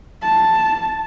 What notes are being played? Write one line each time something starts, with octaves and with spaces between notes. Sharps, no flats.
A5